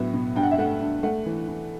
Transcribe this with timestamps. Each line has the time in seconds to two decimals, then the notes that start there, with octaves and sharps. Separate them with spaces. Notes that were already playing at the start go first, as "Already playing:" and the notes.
Already playing: A2 F#3 B3 E5
0.13 B2
0.36 G2 G5
0.43 F#5
0.51 E5
0.58 A3 F#5
0.81 G2
1.03 A3 F#5
1.26 E3
1.48 E3